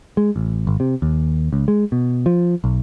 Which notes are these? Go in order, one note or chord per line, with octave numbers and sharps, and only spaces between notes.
G#3
A1
G#1
C3
D#2
C#2
G#3
B2
F3
B1